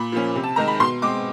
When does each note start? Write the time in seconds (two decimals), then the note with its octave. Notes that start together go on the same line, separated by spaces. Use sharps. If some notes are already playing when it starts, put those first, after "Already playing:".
Already playing: A#2 B5
0.12 F3 A#3 C#4
0.35 C3
0.44 A5
0.56 D#3 G#3 A#5
0.68 B5
0.80 B2 C6
1.02 G#3 C4 D6